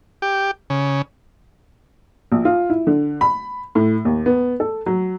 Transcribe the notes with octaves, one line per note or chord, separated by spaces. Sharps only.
G4
C#3
A#1
F4
E4
D3
B5
A2
D#2
B3
A4
F#3